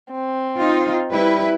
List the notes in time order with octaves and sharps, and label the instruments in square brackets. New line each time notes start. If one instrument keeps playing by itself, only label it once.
[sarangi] C4
[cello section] D#4 F4
[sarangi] G3 [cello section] E4 B4